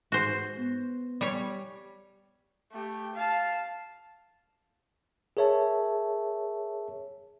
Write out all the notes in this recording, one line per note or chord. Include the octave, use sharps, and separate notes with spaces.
G#2 F#4 C5
B3
G3 C#5
A3 G4
F5 A5
G#4 A#4 C#5 E5 A5